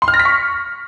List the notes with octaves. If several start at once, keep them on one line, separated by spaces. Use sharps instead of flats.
C6
F6
A#6
B6
C#6